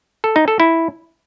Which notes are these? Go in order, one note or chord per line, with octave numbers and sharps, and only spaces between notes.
A4
D#4
A4
E4